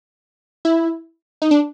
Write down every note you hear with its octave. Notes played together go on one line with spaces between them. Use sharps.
E4
D#4
D4